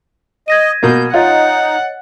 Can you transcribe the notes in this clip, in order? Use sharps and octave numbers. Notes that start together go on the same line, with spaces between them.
D#5 G#6 A#6 D#7
B2 A#3 G6
D#4 F4 C#5 D#5 F#5 A6